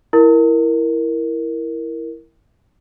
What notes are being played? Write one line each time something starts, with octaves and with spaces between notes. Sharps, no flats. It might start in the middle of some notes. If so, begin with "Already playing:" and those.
E4 A#4